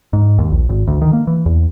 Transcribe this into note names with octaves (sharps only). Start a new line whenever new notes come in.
G#2
D#2
A#1
G#1
D2
D#3
A#3
E3
E2